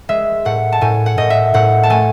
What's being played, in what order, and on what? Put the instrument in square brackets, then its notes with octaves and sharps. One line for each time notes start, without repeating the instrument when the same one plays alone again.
[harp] G#3 E5
A2 F#5
A5
A2 G#5
F#5
A2 D#5
E5
A2 F#5
A5
A3 G#5